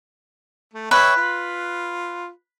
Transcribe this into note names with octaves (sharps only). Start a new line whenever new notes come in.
A3
B4 C#5 E5 G5
F4